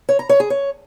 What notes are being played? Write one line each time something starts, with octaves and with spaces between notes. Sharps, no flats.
C#5
A#5
C#5
G#4
C#5